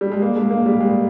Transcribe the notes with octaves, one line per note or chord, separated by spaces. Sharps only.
G3
G#3
A#3
G#3
A#3
G3
G#3